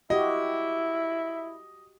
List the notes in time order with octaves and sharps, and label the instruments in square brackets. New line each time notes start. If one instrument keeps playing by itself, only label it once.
[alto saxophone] E4 [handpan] F#4 G4 [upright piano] D#5 [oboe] E5